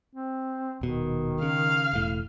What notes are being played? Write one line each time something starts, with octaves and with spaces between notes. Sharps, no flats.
C4
D#1 B2 D#3
C#3 F5
E1 A2